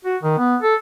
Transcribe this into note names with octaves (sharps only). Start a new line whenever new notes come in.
F#4
D#3
B3
A4